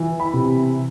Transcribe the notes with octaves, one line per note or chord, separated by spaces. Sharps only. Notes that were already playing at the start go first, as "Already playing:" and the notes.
Already playing: E3
B5
C3